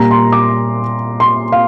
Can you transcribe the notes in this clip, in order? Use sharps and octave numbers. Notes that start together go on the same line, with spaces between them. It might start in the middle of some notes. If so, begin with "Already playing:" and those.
Already playing: A#2 G3 A#3 A#5
C6
D6
C6
F5